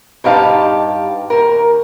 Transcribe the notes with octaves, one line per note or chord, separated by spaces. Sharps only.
G2 D#4 G4 F5 A5
D#2 A#4